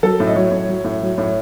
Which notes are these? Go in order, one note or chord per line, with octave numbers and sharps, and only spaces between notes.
F#3 A4
A2
D#5
F#3 C#5
A2
F#3
A2
F#3
A2
C#5